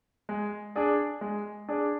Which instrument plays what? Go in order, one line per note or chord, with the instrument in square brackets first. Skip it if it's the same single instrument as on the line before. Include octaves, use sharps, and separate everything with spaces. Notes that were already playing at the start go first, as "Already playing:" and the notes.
[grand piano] G#3
D4 G#4 D5
G#3
D4 G#4 D5